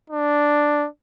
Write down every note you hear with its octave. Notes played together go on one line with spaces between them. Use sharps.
D4